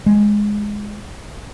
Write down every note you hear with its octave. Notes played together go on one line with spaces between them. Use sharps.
G#3